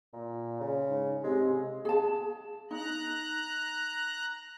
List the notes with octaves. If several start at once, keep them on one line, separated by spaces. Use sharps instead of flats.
A#2
C#3
G#2
C3 G#3
G#4 A5
D#4 A#5 F#6